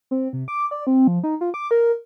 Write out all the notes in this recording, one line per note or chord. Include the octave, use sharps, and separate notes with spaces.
C4
C3
D6
D5
C4
F3
D#4
F4
D6
A#4